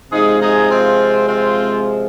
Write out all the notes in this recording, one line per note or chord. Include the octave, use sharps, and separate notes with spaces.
C3 F3 G#3 D#4 G#4
D#4 G#4
C4 F4
C4 F4